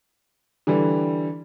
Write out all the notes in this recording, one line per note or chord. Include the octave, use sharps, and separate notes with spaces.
D3 E3 G3